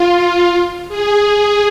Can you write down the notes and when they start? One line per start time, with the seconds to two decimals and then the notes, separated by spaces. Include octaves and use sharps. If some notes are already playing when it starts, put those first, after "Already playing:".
Already playing: F4
0.13 F4
0.89 G#4
1.25 G#4